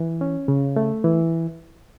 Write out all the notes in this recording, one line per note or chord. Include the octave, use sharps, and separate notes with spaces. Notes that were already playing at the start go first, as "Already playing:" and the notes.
Already playing: E3
C#4
C#3
A3
E3